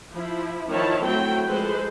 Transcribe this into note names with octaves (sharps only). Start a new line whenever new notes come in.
F3 E4
D#3 F3 E4 C#5 A5
F#3 A3 C4 E4 G5
F3 G#3 A4 B4 C5